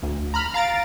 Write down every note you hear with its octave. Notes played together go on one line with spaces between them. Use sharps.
D2
A#5 B5 F6
F5 A#5 A6 D7